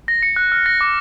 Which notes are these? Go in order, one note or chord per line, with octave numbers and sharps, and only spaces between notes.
A#6
C#7
F#6
F6
A#6
D6